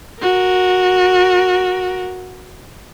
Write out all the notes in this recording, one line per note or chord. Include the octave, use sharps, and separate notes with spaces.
F#4 A#4